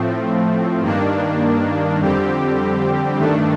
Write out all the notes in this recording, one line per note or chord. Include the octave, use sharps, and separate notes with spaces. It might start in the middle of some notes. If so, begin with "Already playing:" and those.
Already playing: A2 F3 A3 C4
G2 D#3 A#3 D4
F2 D3 G3 C4 G4
G2 D#3 A3 D4